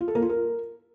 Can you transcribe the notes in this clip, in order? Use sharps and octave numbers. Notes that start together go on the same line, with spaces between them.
F4
A4
A#3
F4
A#4